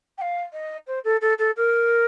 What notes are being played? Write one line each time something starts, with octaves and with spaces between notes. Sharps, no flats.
G5
F5
D#5
C5
A4
A4
A4
A#4